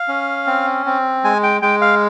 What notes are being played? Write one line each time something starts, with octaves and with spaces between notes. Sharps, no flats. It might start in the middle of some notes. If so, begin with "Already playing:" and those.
Already playing: F5
C#4
C4
C4
G#3 G#5
G5
G#3 G5
F5